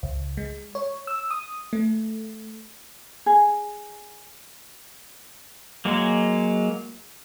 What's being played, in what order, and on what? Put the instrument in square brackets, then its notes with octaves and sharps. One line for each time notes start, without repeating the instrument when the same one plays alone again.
[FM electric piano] C#2
G#3
C#5
E6
D#6
A3
[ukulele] G#4
[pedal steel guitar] F#3 G#3 A#3